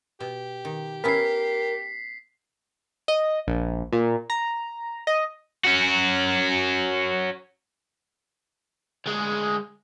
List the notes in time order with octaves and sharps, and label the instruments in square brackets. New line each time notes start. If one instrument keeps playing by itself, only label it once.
[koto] B2 [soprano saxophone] G4
[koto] D#3
[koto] B3 C#4 E4 [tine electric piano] A#4 [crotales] B6 C7
[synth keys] D#5
A#1
A#2
A#5
D#5
[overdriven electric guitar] C#4 F#4
D2 G#3